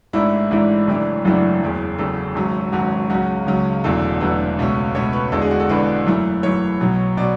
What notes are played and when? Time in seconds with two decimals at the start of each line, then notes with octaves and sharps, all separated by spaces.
0.13 A1 G#2 E3 A3 D4 E4
0.51 A1 G#2 E3 A3 D4
0.87 F#1 F#2 E3 A3 D4
1.25 F#1 F#2 E3 A3 D4 F#4
1.62 F#1 E2 C#3
1.99 F#1 E2 C#3 A4
2.35 G#1 G#2 F#3 C#4
2.72 G#1 G#2 F#3 C#4 F#4
3.10 C#2 C#3 F#3 C#4 F#4
3.47 C#2 C#3 F#3 C#4
3.84 E1 E2 D3 F#3 A3 A4
4.20 E1 E2 D3 F#3 A3 B4
4.58 C#2 B2 A3 C#4
4.95 C#2 B2 A3 C#4 C#5
5.13 B4
5.32 E1 E2 D3 G#3 A4
5.42 G#4
5.51 F#4
5.60 A4
5.69 E1 E2 D3 G#3 B4
6.07 F#2 E3 A3
6.43 F#2 E3 A3 C#5
6.81 B1 B2 F#3
7.17 B2 F#3 D5